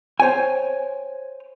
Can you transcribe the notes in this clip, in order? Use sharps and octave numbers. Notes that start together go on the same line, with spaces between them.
C5 C#5 G5 G#5